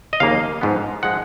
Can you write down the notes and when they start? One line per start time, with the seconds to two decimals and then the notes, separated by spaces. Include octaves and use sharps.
0.13 D#5
0.20 D#2 C#3 F3 A#3 F5
0.61 G#2 F3 B3
1.03 F3 G#3 F#5